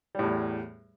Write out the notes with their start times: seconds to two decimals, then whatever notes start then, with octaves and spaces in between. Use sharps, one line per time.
0.15 G3
0.19 A2
0.23 E2